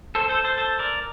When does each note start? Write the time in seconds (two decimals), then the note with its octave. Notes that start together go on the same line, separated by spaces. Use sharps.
0.15 A4 C5
0.29 A4 C5
0.44 A4 C5
0.58 A4 C5
0.79 A#4 D5